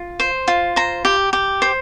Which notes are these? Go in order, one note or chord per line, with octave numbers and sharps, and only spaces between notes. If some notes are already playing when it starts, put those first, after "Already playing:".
Already playing: F4
C5
F4
C5 A#5
G4
G4
C5